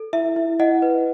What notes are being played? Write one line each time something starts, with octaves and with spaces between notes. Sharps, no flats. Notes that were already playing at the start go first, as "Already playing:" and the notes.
Already playing: A4
E4 E5
E4
E4 D#5 F#5
B4